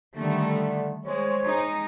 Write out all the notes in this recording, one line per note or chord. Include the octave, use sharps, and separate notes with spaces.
D3 D#3 G3 A3
G#3 C5 C#5
G#3 D#4